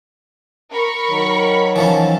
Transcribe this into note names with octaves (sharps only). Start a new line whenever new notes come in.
A#4 B5 C#6
D#3 F#3
E3 F3 C#4 A5